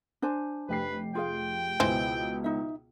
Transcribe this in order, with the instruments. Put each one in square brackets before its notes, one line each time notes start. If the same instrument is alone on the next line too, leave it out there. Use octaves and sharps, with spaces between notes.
[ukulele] D4 C5 G#5
[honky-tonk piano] F1 G4 C7 [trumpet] B4
[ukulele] F4 G#4 F5 [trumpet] G5
[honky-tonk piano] C#2 B2 [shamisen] E3 C5
[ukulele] D#4 E5